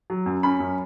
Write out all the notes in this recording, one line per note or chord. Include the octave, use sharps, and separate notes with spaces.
F#3
F#2
C#4 B5
F#2